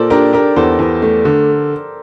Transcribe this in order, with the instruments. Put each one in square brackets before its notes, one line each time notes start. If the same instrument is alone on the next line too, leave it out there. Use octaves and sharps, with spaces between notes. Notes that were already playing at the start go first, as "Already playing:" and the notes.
Already playing: [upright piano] A#2 [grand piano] A4 A#4 C5 D5
[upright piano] D4 [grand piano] G4 A#4
[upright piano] D4 [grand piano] G4 A#4
[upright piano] E2 [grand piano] A4 C5
[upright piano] E2
A3
D3